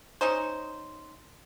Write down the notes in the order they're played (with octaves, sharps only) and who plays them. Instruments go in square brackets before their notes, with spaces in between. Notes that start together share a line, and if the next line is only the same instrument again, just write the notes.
[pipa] C#4 D#4 C5